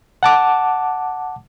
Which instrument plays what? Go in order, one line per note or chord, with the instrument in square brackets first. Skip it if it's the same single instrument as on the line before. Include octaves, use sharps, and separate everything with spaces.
[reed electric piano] F#5 A5 D6